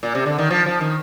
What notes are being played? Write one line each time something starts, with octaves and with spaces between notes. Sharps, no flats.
A#2
C3
D3
D#3
F3
F3
D#3